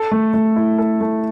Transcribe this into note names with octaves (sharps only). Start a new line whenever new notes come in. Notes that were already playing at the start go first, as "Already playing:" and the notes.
Already playing: A4
A3
A3
E4
A4
A3